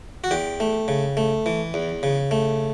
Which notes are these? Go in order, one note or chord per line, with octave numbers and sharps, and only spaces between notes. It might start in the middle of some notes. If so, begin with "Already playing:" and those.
F#4
E2 G4
A3
C#3
A3
E3
E2
C#3
A3